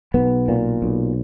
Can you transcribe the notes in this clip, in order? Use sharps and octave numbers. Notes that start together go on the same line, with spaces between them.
B1 B3
A#2
B1